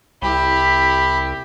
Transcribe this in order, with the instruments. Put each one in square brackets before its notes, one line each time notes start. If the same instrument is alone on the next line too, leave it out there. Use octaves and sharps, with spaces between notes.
[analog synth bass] C2 [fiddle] E4 G4 [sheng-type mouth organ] B5